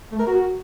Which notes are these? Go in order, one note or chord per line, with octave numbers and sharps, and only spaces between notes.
A3
A#4
F#4